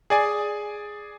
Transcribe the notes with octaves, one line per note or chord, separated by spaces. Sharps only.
G#4 D5 G#5